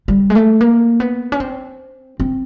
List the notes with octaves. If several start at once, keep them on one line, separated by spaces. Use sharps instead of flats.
G3
G#3
A3
A#3
B3
C#4
C4
C4